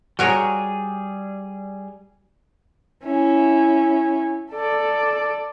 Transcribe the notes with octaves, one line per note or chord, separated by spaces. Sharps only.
G3 F#4 G#4 A#4 C#5
C#4 E4
A4 D5